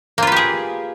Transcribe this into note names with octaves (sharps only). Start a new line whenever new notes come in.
A#3 F4 G4 G#4 B4